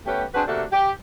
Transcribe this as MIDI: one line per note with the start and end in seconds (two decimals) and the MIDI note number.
0.06 0.24 57
0.06 0.24 59
0.06 0.24 61
0.06 0.24 67
0.35 0.43 60
0.35 0.43 62
0.35 0.43 66
0.35 0.43 68
0.35 0.43 71
0.35 0.43 72
0.47 0.64 48
0.47 0.64 57
0.47 0.64 58
0.47 0.64 62
0.47 0.64 66
0.47 0.64 69
0.72 0.91 67